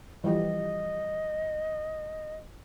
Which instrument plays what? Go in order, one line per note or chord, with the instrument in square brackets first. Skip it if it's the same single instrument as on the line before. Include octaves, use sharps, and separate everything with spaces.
[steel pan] E3 F3 G3 [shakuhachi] D#5